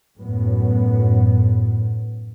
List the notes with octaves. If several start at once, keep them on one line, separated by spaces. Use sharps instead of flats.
F#2 A2 B3